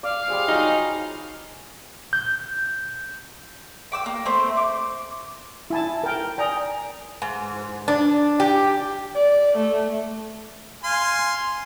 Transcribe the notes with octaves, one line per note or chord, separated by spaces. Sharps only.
D5 F5
G3 G#4 C5
F#3 D#4 F4 D#6
G6
G5 D6 E6
A#3
A3 C4 C5
D6
E4 G#5 A5
A#4 G5
D5 G5 G#5 A#5 D#6
G#2
D4
G4
D5
A3
F5 G#5 C6